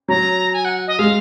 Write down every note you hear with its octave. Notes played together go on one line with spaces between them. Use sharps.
F#3 A#5
G#5
F#5
D#5
G#3 F5